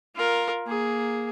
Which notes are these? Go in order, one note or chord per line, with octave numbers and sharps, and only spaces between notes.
F4 A#4
A#3 G#4